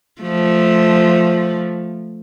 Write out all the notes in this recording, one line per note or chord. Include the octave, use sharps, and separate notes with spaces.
F3 A3